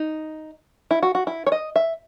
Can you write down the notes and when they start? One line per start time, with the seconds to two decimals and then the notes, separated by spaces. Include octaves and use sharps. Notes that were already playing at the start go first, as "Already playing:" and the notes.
Already playing: D#4
0.91 E4
1.03 F#4
1.15 F#4
1.27 E4
1.46 C#5
1.52 D#5
1.76 E5